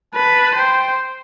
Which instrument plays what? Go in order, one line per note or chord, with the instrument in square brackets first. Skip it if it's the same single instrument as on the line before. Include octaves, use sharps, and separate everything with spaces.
[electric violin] B4 [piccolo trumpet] A5
[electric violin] C5 [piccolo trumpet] G5